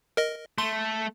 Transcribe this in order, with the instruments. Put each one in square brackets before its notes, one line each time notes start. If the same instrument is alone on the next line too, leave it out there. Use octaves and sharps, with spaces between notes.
[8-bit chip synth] A#4 D#5
[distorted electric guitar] A3 [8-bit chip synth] C6